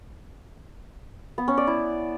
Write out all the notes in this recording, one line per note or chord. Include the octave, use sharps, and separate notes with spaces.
B3
C#4
D5
E4